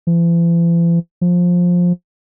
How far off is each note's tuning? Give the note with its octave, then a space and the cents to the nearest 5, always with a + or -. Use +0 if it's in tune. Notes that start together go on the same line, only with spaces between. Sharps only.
E3 +45
F3 +15